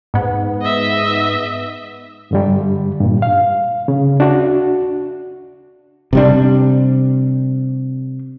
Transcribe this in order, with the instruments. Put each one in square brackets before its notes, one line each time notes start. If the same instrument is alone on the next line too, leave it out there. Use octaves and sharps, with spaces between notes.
[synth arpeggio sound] G#2 B3
[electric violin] D#5 E5
[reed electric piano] G2 D3 G3
G2 A#2
F5
C#3
D4 F#4
[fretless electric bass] C3 G3 D4